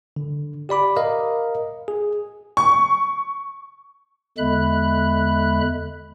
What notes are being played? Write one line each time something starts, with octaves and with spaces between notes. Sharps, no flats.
D3
G4 D5 B5 D6
A#4 D#5 F5
G#4
C#6
E2 D3 G#3 E5 B5 F#6